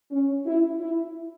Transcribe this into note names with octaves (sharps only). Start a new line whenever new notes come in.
C#4
E4
E4